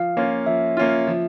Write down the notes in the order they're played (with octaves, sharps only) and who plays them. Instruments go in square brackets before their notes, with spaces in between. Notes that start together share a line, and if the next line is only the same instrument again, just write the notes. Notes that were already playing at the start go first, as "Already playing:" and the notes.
Already playing: [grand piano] F3 [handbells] F5
[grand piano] A#3 C#4 F4
[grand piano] F3 [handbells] E5
[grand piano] A#3 C#4 F4
F3